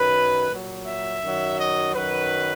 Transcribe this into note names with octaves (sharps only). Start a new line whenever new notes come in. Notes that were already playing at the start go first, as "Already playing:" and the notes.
Already playing: F#2 D#3 F#3 B4
A#2 F#3
E5
F#2 D#3 F#3
D#5
F#2 D#3 F#3 B4